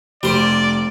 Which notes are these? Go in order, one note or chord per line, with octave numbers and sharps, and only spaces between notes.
F1 G3 C5 D5